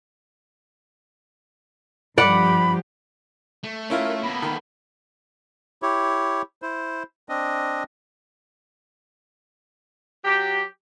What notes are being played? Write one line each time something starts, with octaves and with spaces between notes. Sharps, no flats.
G2 F3 G4 D5 F#5 B5
A3
C#4 E4 F4 A#4
A#3 B3 A4 B5
D#3
E4 G4 C#5
E4 C5
C4 D4 D#5
F#3 G4